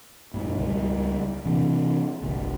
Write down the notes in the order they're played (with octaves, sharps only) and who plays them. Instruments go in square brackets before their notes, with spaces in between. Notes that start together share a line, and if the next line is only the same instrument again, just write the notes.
[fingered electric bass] G2 B2
C#2 G3
C3 E3
G1 C2